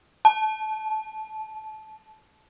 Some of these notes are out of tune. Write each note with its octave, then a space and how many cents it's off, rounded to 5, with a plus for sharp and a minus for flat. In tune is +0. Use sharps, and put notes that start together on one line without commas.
A5 -20